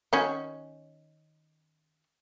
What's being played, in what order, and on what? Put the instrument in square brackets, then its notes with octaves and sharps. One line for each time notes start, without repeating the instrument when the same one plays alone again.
[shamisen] D#3 C#4 F#4